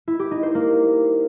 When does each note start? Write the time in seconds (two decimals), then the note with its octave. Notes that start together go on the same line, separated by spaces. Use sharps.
0.08 E4
0.19 G4
0.31 D#4
0.43 C5
0.55 A#3